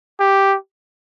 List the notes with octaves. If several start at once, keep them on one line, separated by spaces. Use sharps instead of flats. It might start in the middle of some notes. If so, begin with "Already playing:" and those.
G4